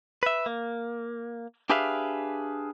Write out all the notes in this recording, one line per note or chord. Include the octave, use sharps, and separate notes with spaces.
B4 E5
A#3
D4 G4 G#4 B4 E5 F5